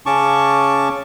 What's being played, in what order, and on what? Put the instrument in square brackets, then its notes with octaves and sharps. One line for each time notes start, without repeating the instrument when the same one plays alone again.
[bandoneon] C#3 C#4 A5 C#6 D6